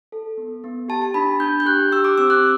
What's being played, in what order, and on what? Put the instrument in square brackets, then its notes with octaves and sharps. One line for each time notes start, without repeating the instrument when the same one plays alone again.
[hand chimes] A4
B3
B3
G4 A5
A5
D4 B5
D4 G6
G6
G4 F#6
G4 E6
D6
C4 E6
F#6